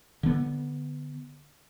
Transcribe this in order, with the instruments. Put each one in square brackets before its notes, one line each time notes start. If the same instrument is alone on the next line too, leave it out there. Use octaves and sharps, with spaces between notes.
[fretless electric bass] D3 B3